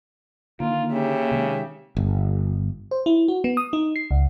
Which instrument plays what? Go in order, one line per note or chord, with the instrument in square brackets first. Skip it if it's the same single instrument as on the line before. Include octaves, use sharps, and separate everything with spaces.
[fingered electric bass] D3 D#3 [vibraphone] A#3 [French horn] F4
[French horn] C#3 [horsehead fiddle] G4 E5
[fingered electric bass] C3 D#3 G#3
[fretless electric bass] G1
[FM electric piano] C5
E4
F#4
B3
D#6
D#4
C7
C#2